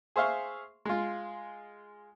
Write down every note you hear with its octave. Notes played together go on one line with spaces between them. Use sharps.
G#4 C5 E5 F5 C6 C#6
G#3 F4